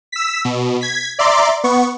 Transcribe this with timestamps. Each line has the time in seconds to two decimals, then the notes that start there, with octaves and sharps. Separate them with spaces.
0.12 E6 B6
0.45 B2
0.81 G#6 B6
1.19 D5 E5 A#5 C6 D6
1.64 B3 C#6